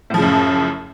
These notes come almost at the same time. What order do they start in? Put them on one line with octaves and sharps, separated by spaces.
A2 F3 C#3 F#2